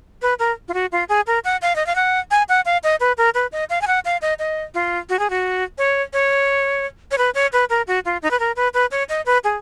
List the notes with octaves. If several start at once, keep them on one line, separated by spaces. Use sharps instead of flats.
B4
A#4
F4
F#4
F4
G#4
A#4
F#5
F5
D#5
F5
F#5
G#5
F#5
F5
D#5
B4
A#4
B4
D#5
F5
G#5
F#5
F5
D#5
D#5
F4
F#4
G#4
F#4
C#5
C#5
C#5
B4
C#5
B4
A#4
F#4
F4
D#4
B4
A#4
B4
B4
C#5
D#5
B4
G#4